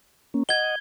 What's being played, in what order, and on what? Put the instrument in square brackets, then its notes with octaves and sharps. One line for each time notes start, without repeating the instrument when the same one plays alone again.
[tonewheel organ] A#3 C#4
[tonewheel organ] D#5 F#5 [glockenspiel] G#6 G7